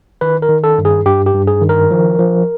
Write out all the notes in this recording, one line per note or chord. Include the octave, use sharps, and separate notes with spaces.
D#3 B4
A#4
D#3
A4
G2
G#4
G2 G4
G4
G2
G#4
D#3
A#4
F3
F3